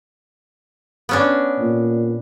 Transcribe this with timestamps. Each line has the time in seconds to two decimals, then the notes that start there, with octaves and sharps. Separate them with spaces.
1.09 B3 C#4 D4
1.59 A#2